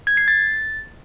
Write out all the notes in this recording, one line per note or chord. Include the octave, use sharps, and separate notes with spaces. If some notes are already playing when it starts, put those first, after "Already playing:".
G#6
C7
A6